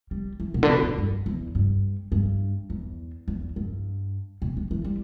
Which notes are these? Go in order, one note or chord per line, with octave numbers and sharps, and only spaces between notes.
G3
E3
B2
D3
B2
A2
G2
E2
G2
G2
E2
E2
G2
B2
D3
E3
G3